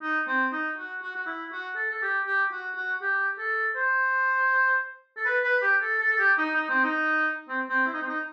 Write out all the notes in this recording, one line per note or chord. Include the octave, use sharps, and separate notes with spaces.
D#4
C4
D#4
F#4
F#4
F#4
E4
F#4
A4
A4
G4
G4
F#4
F#4
G4
A4
C5
A4
B4
B4
G4
A4
A4
A4
G4
D#4
D#4
C4
D#4
C4
C4
E4
D#4
C4
D#4